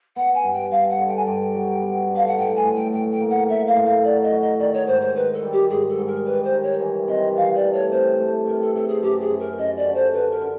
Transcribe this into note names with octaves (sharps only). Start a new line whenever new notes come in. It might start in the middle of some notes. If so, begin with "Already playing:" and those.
B3 F#5
G#5
G2
G5
G2 F5
F#5
D3
G5
G#5
G2 G5
F#3
B3
D3
F5
F#5
A2 G5
G#5
A2
G5
A2 G5
G5
A#3
F#5
A2 E5
F5
A2
F5
F#3 D5
D#5
F#3
D#5
D#3 D5
C#5
G#2 C5
C5
D#3 B4
A4
G3
G4
G#2 G#4
A4
G#2
A#4
G3 B4
C5
D#3
C#5
E3
C3 D#5
E3 F5
D5
A3
C#5
C3 C5
A3
C3 A#4
A4
C3 A4
G#4
F#2 G4
G#4
F#2
A#4
F#2 D#5
D5
D3
C5
D3 B4
A#4
D3